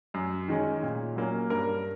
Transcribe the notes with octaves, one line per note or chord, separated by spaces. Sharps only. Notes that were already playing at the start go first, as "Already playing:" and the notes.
F#2
D#3 G#3 C#4
A#2
F#3 A#3 C#4
G2 A#4